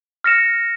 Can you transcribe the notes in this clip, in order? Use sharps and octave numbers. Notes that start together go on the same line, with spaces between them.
F6 A#6 C#7 E7